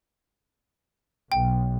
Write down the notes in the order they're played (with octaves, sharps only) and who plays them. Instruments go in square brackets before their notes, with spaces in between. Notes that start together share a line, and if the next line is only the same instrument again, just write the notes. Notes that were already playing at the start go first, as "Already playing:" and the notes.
[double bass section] B1 [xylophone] G5